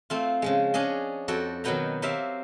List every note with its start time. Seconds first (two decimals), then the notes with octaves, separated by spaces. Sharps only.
0.10 A3 C4 F4
0.42 C#3 F3 G#3
0.74 C#4 D4 G#4 D#5
1.28 F2 F#4 A4 G5
1.64 B2 D#3 F#3 B3 G5 A#5
2.02 F#3 C4 G4 E5 F5